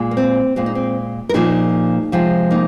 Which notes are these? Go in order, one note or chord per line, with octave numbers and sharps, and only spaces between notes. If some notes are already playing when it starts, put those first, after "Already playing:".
Already playing: A#2 G#3
A#3
C4
A#2 G#3 C4
D#4
C4
A#4
A#2 F3 A#3 D#4 G#4
C3 F3 G#3
A#3 D#4